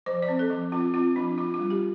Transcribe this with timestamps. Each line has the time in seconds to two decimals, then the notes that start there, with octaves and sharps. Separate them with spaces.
0.06 F3 C5
0.22 D5
0.29 C4
0.39 A4
0.50 F3
0.72 C4 F4
0.94 C4 F4
1.16 F3 D4
1.37 D4 F4
1.54 F4
1.60 G3
1.70 G4